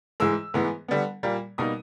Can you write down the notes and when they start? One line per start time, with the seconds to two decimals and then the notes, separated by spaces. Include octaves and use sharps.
0.20 G#2 E3 G#3 E6
0.54 G#2 E3 G#3 B3
0.88 D3 G3 B3
1.23 A#2 G3 A#3
1.58 B2 G3 A#3 D#4 D#6